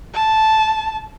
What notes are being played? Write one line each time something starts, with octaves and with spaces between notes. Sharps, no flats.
A5